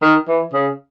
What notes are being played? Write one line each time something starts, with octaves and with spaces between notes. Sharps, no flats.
D#3
E3
C#3